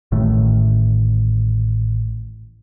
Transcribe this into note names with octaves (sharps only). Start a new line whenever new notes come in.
A1 A2 D#3 A3